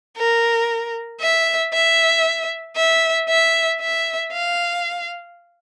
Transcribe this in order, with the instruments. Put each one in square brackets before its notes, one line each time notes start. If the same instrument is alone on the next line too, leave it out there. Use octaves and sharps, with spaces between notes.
[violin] A#4
E5
E5
E5
E5
E5
F5